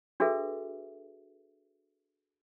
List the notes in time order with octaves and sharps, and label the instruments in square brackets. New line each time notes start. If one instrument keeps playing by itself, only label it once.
[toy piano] D4 F#4 G#4 A4 B4 E5